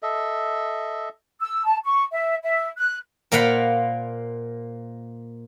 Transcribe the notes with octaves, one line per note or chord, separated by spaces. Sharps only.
A4 D#5 E5
E6
A5
C#6
E5
E5
F#6
A#2 A#3 C5 F5 F#5 B5